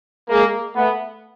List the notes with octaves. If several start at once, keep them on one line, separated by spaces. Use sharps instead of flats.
G#3 A#3
A3 B3